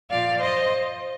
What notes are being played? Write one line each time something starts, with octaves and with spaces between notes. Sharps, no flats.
A#2 F3 D5 F5
C5 D#5